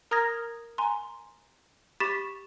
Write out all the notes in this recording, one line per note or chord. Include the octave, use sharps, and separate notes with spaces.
A#4 A#5 D#6 F6 G#6 A#6
G#5 A#5 C6
G4 B5 C#6 A6 B6 E7